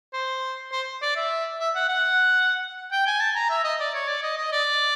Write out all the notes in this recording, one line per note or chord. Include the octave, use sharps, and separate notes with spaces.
C5
C5
D5
E5
E5
F#5
F#5
G5
G#5
A5
A#5
E5
D#5
D5
C#5
D5
D#5
D#5
D5